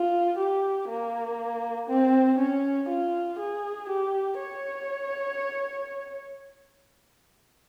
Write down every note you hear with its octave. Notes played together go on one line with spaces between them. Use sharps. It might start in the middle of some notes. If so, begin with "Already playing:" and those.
Already playing: F4
G4
A#3
C4
C#4
F4
G#4
G4
C#5